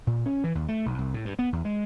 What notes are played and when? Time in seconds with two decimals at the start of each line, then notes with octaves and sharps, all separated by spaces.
0.07 A#2
0.26 C#4
0.44 E3
0.55 D#2
0.68 A3
0.86 B1
0.98 C2
1.14 A2
1.25 G2
1.39 B3
1.53 E2
1.65 G#3